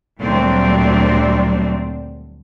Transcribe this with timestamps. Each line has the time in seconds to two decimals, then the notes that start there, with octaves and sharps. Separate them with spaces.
0.18 D2 A#2 F#3 G3 C4 D4